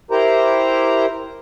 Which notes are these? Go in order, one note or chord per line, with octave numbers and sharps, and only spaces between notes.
E4 G4 A#4 C5 A#5